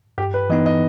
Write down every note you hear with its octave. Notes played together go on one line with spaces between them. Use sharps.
G2 G4
B4
E3 B3 D#4 D#5
D#5